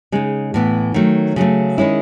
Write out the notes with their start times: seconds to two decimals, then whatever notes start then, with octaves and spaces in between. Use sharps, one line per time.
0.12 C#3 G#3 D#4
0.54 A2 E3 B3
0.94 D#3 F#3 A3
1.36 C#3 F#3 A3
1.78 D#3 G#3 C#4 E4